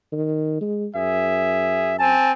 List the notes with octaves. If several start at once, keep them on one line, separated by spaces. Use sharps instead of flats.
D#3
G#3
F#2 G#4 E5
C4 G#5 A5